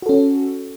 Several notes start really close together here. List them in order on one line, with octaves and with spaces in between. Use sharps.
F#4 A4 C#4